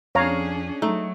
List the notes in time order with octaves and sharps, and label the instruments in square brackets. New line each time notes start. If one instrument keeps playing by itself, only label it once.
[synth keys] F2 [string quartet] C#4 D4 G#4 [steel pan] C#5 F5 A#5
[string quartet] F#3 [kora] A3 [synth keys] D#4